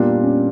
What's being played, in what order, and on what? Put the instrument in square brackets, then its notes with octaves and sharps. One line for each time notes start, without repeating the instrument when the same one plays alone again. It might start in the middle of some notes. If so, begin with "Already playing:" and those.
Already playing: [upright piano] A#2 G3 A#3 D4 F4 [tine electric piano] B3
[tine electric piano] C#4